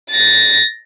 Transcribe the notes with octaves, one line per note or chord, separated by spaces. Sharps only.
A6 A#6